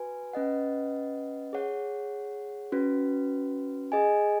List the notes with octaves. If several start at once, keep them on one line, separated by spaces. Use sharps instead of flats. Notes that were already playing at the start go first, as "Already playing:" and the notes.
Already playing: F#4 B4 G#5
C#4 B4 D#5 F#5
G#4 C#5 F#5
C#4 F#4 B4
G#4 D#5 G#5